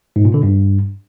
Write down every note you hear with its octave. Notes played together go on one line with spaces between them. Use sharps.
G#2
A#2
D3
G2